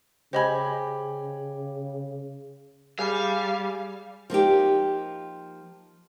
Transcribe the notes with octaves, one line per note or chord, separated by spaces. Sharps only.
C#3 G4 C5 D#5 G#5 B5
G3 G#4 F5
F3 A#3 D#4 G4